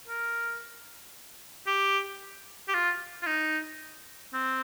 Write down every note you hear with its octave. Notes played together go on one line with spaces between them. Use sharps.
A#4
G4
G4
F4
F4
D#4
C4